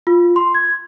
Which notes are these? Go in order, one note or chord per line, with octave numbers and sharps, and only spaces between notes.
F4
C6
G#6